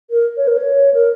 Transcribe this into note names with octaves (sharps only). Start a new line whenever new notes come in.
A#4
C#5
A#4
C#5
A#4